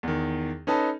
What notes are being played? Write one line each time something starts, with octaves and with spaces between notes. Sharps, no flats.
E2 D#3
C#4 D#4 A4 B4 D#5 A5